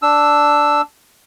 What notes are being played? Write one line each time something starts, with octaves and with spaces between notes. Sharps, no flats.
D4 E6